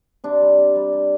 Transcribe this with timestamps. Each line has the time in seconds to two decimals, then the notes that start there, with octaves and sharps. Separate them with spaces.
0.24 C3 D4
0.41 G3
0.58 C3
0.76 G3
0.93 G3